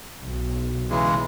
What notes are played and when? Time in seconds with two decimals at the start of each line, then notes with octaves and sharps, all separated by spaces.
0.22 B1
0.90 C#3 E3 G#3